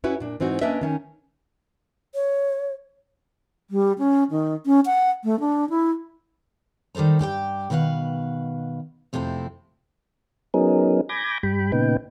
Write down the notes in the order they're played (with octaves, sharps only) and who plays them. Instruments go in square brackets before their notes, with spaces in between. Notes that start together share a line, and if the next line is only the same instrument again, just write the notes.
[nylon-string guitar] C#4 E4 F#4 B4
A#2 D4
G#2 E3 C4 D#4 F#4
A#3 C#4 D4 B4 D#5 E5
D#3 C#4 D#4
[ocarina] C#5
[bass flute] G3
C#4
D#3
C#4
F#5
A3
D4
E4
[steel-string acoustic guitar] D#3 G3 A4 C5 A#5
G2 G4 B4 G5
B2 D#3 B4 F5 F#5
F2 C3 A3 C4 E4
[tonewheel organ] F#3 B3 C#4 D#4 G#4 A#4
G#5 B5 D6 G6 G#6 A#6
G2 G3 G5 B5
A#2 C#3 B3 D#4 B4 G5